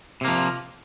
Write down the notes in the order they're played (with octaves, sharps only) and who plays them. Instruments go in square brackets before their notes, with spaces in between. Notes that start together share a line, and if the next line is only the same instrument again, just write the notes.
[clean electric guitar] C3
A#3
F3